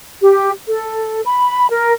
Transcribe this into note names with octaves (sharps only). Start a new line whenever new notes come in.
G4
A4
B5
A#4